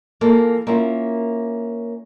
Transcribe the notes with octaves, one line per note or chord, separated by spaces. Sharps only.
E3 A#3 F4 A4
A#3 C#4 E4 F4 A#4